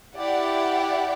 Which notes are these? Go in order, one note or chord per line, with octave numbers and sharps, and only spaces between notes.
E4 G4 D5 F#5